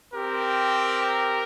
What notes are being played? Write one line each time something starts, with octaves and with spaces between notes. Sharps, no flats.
C4 G4 A#4